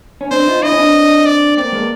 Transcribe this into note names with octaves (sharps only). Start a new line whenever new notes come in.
C#4
C4 D4 C5
D#4 F4
D4 E4 D#5
C#4
C4 D4
D5
A#3 C4 D5
G#3 A#3